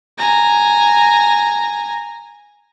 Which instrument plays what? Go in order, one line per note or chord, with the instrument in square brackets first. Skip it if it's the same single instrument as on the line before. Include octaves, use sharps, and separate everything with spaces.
[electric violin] G#5 A#5